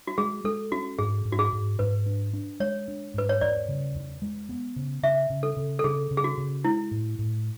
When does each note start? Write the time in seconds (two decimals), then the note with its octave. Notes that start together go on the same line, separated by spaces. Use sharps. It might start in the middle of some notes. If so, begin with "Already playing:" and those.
0.07 F#4
0.18 G#3 G#4
0.44 G#3 A4
0.72 C#4 F#4
0.98 G#2 G#4
1.25 G#2
1.32 F#4
1.39 G#4
1.53 G#2
1.79 G#2 B4
2.06 D4
2.33 D4
2.60 G#3 C#5
2.88 D4
3.14 G#2 B4
3.29 C#5
3.41 E2 D5
3.68 C#3
3.95 E2
4.22 G#3
4.49 B3
4.76 C#3
5.03 C#3 E5
5.30 C#3
5.43 A4
5.57 C#3
5.79 A4
5.84 C#3 G#4
6.11 C#3
6.17 G#4
6.24 F#4
6.38 C#3
6.64 G#3 E4
6.91 A2
7.19 A2